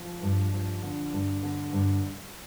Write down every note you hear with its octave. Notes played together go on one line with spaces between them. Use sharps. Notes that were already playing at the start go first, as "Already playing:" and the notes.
Already playing: F3
G2
F3
D3
G2
D3
G2